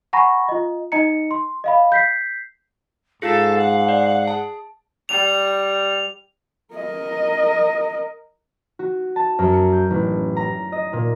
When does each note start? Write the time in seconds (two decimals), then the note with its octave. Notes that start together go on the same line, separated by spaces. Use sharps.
0.13 F#5 G#5 A#5 B5 C#6 A#6
0.49 F4 D#5
0.92 D#4 D#5 A#5 C#7
1.31 C6
1.64 D#5 F5 B5
1.92 G6 B6 C7
3.22 G#2 F4 G#4 A4 F5
3.57 F#5
3.88 D5
4.28 G#4 A5
5.09 G3 F7
6.74 A#4 D#5
8.79 F#4
9.16 A5
9.39 F#2
9.53 C#7
9.73 G6
9.91 A1
10.36 A#5
10.72 D#5
10.93 A#2